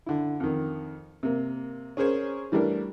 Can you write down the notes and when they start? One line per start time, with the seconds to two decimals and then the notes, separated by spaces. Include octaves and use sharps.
0.06 D3 E4
0.40 F2 D#3
1.23 C3 A#3
1.97 C#4 G#4 A#4 C5 C#5
2.52 E3 G3 A3 D4 A#4